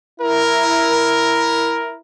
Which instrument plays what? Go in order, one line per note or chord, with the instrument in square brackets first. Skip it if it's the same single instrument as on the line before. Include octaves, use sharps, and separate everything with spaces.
[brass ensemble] E4 A#4